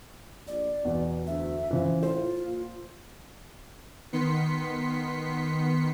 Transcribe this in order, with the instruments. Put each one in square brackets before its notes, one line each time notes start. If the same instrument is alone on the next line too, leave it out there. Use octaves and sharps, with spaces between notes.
[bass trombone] A#1 [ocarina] D5
[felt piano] E2 [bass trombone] B2
[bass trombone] D2 [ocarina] E5
[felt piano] C#3 E3 [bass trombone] F3
[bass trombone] A2 [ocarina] F4 [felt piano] C5
[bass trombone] A#2
[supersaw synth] D#3 B3 C6 B6 C#7